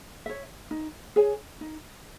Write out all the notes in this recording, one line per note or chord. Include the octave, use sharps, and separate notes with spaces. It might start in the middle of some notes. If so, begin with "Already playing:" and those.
C#5 E5
D#4
G#4 C#5 G#5
D#4